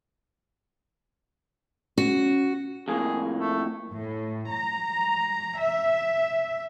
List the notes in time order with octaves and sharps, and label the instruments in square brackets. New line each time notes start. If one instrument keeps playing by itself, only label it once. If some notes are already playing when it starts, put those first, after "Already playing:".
[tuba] C#4 [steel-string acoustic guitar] F#4
[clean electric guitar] F2 A2 A#3 [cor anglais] G#4
[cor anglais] A3
[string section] A2
A#5
E5